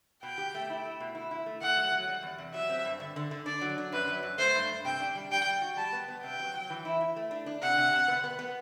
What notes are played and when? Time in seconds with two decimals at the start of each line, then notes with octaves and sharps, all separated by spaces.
0.23 B2 G5
0.38 G4
0.54 A3
0.70 E4
0.85 A3
1.00 B2
1.15 E4
1.31 E4
1.46 A3
1.61 A3 F#5
1.77 F#3
1.92 F#3
2.08 G3
2.23 E2
2.38 C3
2.54 F#3 E5
2.69 C4
2.85 G2
3.00 D3
3.16 D3
3.31 D3
3.46 D4 D5
3.61 F#3
3.78 D4
3.92 F#2 B4
4.08 F#3
4.23 F#2
4.38 A3 C5
4.55 G2
4.69 G2
4.85 C3 G5
5.00 D4
5.15 G3
5.31 G3 G5
5.47 G3
5.62 F#4
5.77 G3 A5
5.93 B3
6.08 B3
6.23 C3 G5
6.39 F#3
6.54 F#3
6.70 E3
6.85 E4
7.01 E4
7.16 A3
7.31 D4
7.46 D4
7.62 C3 F#5
7.78 C3
7.93 C3
8.08 B3
8.24 B3
8.39 B3